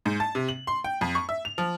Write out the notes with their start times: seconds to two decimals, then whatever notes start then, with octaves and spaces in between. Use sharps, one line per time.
0.06 G#2
0.20 A5
0.35 C3
0.49 F#7
0.67 C6
0.84 G5
1.01 F2
1.15 C#6
1.29 E5
1.45 F7
1.58 F3